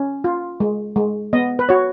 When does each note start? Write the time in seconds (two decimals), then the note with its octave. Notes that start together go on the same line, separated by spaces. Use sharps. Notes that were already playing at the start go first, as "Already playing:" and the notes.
Already playing: C#4
0.24 F4
0.60 G#3
0.96 G#3
1.33 B3 D#5
1.59 B4
1.69 F#4 C#5